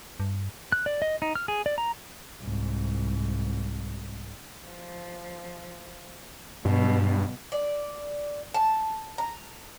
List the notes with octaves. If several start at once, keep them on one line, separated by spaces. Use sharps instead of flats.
G2
F#6
D5
D#5
D#4
F6
G#4
D5
A#5
C2 G#2
F3
G2 B2 F#3
D5
A5
A#5